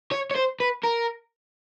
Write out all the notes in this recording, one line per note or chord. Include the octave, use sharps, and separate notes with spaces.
C#5
C#5
C5
B4
A#4